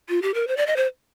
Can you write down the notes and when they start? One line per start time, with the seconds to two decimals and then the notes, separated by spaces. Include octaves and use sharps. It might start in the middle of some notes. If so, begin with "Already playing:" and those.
0.09 F4
0.22 G4
0.34 A#4
0.48 C5
0.57 D5
0.67 D#5
0.76 C5